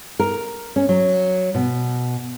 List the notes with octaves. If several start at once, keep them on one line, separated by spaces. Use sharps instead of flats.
A#4
C#4
F#3
B2